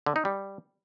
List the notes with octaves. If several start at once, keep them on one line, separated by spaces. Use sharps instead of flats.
D3
D#4
G3